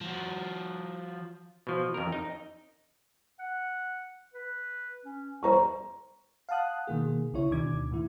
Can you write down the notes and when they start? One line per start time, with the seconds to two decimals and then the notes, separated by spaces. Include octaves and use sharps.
0.01 F3 F#4
1.67 B2 F3
1.94 F2 A#4
2.12 D#4
3.39 F#5
4.34 B4
5.05 C#4
5.43 G3 C5 A#5 C#6
6.49 F5 F#5 A5 D#6 F#6
6.87 B2 D#3 A#3 G#4
7.33 B1 C#3 E4 C#5
7.51 D2 B2 D#3 D4 D6 G#6
7.91 A2 D#3 E4